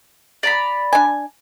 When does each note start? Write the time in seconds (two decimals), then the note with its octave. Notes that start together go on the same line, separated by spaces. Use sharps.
0.43 D5 A#5 B5
0.93 D4 G#5